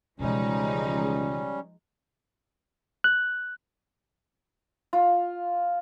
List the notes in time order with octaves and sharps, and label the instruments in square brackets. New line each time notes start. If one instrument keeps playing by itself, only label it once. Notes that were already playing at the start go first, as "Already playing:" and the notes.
[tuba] C#2 [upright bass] B2 E3 [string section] F3 G#3 D#4 [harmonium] G3 C#4
[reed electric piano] F#6
[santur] F4